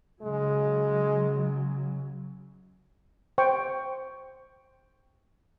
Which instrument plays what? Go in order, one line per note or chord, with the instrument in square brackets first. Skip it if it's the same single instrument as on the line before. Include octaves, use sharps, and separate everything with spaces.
[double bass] C#3 F#3 [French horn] G#3
[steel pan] C5 G5 C#6